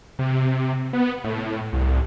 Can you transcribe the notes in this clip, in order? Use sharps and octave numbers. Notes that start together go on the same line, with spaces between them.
C3
B3
A2
C2